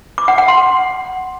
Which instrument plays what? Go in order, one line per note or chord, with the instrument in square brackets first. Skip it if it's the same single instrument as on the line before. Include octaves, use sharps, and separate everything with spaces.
[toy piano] D6
F#5
F#5
C6